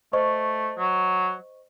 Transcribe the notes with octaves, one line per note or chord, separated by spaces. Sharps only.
A3 C5 D#5 C#6
F#3